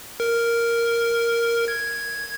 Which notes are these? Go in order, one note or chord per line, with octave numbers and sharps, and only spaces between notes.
A#4
G#6